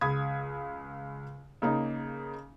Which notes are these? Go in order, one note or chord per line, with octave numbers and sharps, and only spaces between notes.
C#2 B5 D#6 G#6
C#3 A#3 D#4